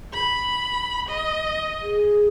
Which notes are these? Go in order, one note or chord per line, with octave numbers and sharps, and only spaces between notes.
B5
D#5
G#4